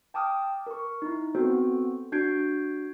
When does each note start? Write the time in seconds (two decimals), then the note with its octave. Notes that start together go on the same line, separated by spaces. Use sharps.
0.14 G5 A5 D6 D#6 F6
0.67 A#4 C#6
1.02 D#4 E4
1.35 B3 C4 F#4 A4 C5
2.12 D4 F#4 G6 G#6 C7 D7